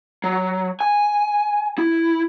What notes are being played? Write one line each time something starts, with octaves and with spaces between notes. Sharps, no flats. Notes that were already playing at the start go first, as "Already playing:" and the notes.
F#3
G#5
E4